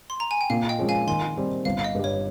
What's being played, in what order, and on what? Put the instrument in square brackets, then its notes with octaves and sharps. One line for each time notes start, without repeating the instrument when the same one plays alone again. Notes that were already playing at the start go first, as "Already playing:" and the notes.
[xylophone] C6
A#5
G#5
G5
[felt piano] A#2 [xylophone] F5
[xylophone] D#5 G5
[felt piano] F3 G#3 C#4 G#4
[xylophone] F5 G#5
[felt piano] D#3 [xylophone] G#5 C6
[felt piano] G3 C4
[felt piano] G1 [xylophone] F5
[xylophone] F5
D#5
[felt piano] G2 G3
[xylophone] C#5